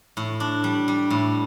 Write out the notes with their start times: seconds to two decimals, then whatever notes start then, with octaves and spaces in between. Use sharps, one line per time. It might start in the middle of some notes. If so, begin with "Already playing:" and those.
0.17 A2
0.40 D4
0.64 G3
0.88 G3
1.10 A2